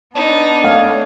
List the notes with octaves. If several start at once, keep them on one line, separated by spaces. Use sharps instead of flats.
B3 D4 D#4 A5
A3 C#5 F5